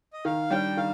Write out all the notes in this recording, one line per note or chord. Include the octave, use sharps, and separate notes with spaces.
D#5
D#3 F5
G3 D4 G5
D#3 F5